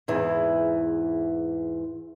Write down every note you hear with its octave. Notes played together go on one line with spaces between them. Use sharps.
E2 G#2 E3